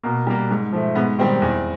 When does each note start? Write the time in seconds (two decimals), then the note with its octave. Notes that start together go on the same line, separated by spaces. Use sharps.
0.03 B2 A#3
0.27 G3 A#3
0.51 G#2
0.73 F3 A3
0.95 G#2 B3
1.18 D#3 G3 C4
1.42 E2